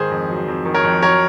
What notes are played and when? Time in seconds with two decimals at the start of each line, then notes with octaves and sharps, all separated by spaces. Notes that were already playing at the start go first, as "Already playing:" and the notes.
Already playing: G#2 D#3 G#4 C5
0.11 F2
0.29 F#3
0.48 F2
0.65 D#3
0.74 A#4 C#5
0.84 F2
1.02 F#3 A#4 C#5